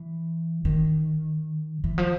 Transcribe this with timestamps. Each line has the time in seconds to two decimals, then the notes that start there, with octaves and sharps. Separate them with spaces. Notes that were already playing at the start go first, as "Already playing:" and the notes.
Already playing: E3
0.65 D#3
1.84 E3
1.98 F3